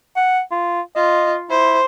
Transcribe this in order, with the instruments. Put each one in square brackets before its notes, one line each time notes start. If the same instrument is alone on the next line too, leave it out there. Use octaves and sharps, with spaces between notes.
[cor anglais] F#5
F4
[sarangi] F4 [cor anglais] D#5
[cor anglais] E4 [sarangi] C5